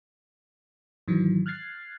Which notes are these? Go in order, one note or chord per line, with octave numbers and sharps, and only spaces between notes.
G#2 D#3 E3 F#3
F6 F#6 G#6 A6 C7